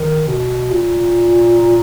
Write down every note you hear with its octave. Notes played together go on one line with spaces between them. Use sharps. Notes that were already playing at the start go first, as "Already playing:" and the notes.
Already playing: D#3
B2
A#2